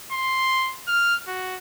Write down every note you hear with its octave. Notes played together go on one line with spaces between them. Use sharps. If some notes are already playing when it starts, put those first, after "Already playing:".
C6
F6
F#4